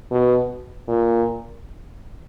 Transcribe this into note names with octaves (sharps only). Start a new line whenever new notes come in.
B2
A#2